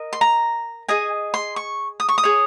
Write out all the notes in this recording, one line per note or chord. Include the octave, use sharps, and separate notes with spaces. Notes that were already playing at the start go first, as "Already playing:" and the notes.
Already playing: A#4 D#5
C6
A#5
G#4 D#5 G#5
C6
C#6
D#6
C#6
D#6
G#4 C#5